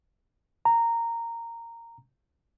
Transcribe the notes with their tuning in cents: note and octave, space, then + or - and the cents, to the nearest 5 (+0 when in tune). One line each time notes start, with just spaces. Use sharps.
A#5 -10